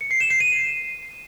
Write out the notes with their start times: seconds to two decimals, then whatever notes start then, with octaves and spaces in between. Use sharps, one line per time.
0.01 C#7
0.11 C7
0.20 E7
0.30 C7
0.40 D#7